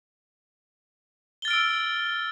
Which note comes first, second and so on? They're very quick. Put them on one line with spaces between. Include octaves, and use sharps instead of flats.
G7 A6 F6 D7 E6